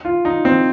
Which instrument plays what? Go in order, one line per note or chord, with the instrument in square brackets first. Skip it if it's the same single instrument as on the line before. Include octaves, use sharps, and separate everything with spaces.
[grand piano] F4
D#4
C4